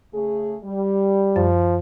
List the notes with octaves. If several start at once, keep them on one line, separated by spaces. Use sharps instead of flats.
C#3 A3 G#4
G3
F#2 F3